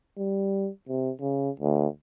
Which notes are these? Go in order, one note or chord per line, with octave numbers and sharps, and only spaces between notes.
G3
C3
C#3
D2